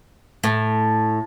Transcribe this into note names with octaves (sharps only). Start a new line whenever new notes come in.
A2